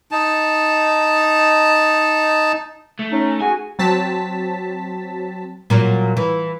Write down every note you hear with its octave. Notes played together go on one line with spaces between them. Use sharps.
D#4 A5
A3
C#4 D#4
F#4 G#4 G#5
F#3 C4 A5 B6
A#2 F#3
E3